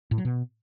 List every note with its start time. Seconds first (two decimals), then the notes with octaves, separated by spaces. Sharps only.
0.11 A2
0.18 F#3
0.25 B2